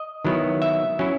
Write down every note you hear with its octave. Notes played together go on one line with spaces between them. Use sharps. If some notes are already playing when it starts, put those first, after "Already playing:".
Already playing: D#5
D#3 F#3 B3 E4
E5
F#3 C#4 E4